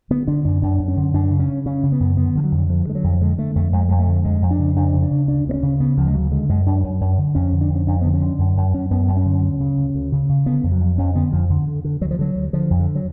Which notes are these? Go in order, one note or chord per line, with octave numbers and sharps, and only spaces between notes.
D3 B3
D3 D4
F#2 D4
F#2 D4
F#2
C#4
D3
F#2 D4
C#3
C#4
C#3
C#3 C#4
C#3
B3
F#2
D3 B3
D3 F3
F#3
F2
F#3
D3 F3
D3 G#3
F#3
F2
D3 G#3
D3 A3
F2 A3
F2 G#3
F2 G#3
A3
D3
F2 G#3
F2
D4
C#3
F2 D4
C#3
D4
C#3
D2 D4
D2 B3
C#4
C#3
C#3 B3
D2 F3
G#3
C#3 F#3
D3 G#3
F#2 G#3
F#2 D4
F#2
F#2
D3
F2 C#4
D3
D4
F2
C#4
F2 D4
D3 B3
C#4
D3
F#2
F#2
F#2 C#4
F#2 B3
F#2
C#4
D3
D2
C#3
D2
D2
C#3
C#3
D3 B3
F2
F#3
F2
F2 C#4
D3 B3
F2 F3
D2 D3
D3
D3
D2 F#3
F3
D3 F#3
D2
D3 F3
F2
D3
F#3